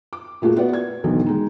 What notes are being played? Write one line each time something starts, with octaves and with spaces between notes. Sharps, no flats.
D6
A#2 A3 A#3 F#4 G#4
B3 E4 F#4 D5 F#5
G#6
B1 E2 D3 D#3 F#3
G#3 D#4